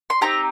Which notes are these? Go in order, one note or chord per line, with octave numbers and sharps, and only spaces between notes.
C6
C4 D#4 G4 A#5